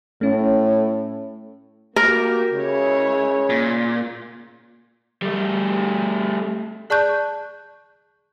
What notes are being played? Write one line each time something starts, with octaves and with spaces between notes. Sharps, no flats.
A2 A3 C#4
A#3 F#4 G4 A#4
C#3 G#3 E4 C#5
A#2
G3 A3
G#4 D5 A5 C#6 F#6 G6